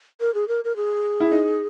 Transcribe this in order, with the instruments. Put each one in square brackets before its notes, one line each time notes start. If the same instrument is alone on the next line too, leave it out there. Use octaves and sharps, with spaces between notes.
[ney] A#4
G#4
A#4
A#4
G#4
[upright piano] E4
D#4